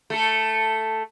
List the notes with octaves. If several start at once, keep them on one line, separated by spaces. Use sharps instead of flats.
A3 A4